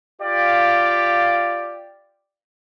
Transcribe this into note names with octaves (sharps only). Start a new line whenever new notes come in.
F4 G4 D5 F5